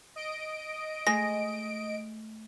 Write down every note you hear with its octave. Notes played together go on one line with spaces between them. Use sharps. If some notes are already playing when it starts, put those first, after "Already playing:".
D#5 D7
G#3 A3 A#6